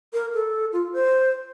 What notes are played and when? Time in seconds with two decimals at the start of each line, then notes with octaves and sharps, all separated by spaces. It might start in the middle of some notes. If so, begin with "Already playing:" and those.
0.13 A#4
0.34 A4
0.72 F4
0.93 C5